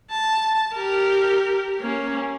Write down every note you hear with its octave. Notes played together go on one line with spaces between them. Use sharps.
A5
G4 A#4
A#3 C#4